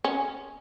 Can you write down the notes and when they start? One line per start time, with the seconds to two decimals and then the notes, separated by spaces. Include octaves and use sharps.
0.04 C#4